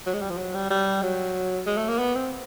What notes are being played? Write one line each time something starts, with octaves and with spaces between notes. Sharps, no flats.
F#3
G#3
G3
F3
F#3
G3
G3
F#3
G#3
A3
A#3
B3
C4